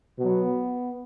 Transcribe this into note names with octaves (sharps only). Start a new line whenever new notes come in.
B2 F#3 B3